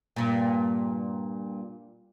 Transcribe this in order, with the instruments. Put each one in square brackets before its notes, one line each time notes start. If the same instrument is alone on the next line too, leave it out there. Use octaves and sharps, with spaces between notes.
[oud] G2 A#2